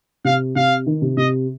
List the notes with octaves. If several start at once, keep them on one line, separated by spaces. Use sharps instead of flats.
C3 F5
C3 F5
D#3
C3
C3 D#5